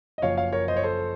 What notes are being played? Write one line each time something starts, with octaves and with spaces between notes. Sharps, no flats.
D#5
F#1 F#2 F3 C#5 F5
C#5 F5
A#4 C#5
C5 D#5
C#5
A4 C5